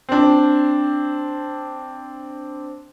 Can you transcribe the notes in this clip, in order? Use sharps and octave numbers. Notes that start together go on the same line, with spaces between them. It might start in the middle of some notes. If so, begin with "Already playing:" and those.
C4 D4